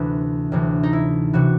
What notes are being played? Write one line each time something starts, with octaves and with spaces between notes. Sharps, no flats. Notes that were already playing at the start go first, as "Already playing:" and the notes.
Already playing: D2 C3 E3 B4
D2 C3 E3
D#4
E4
C3 E3 F#4